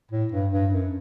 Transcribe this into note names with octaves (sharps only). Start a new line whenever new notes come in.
A2
G2
G2
F#2